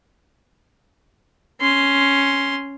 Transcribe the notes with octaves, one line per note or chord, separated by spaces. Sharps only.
C#4 C6